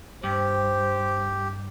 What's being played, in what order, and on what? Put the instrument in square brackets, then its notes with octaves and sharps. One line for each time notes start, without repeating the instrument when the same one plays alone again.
[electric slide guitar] G2 [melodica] G4 [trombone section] C5